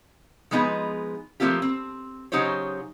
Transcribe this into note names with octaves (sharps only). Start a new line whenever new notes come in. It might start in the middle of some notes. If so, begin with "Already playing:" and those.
F3 G#3 B3 D#4 G#4 B4
F3 A3 A#3 C4 F4 G4
C4
C#3 F#3 D#4 G4 C5 C#5